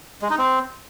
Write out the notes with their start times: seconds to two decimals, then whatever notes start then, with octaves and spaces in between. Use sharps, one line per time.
0.22 G#3
0.30 D#4
0.38 C4